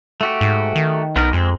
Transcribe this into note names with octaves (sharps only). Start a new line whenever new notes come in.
A3 F#4 G4
G#2
D#3
B1 B3 D#4 A#4
F2 G#3 C4